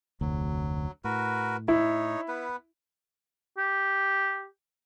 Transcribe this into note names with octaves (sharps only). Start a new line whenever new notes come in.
F1 D2 F#3
A2 F#4 A#4 B4
D#4 E4 C#5
B3 B4
G4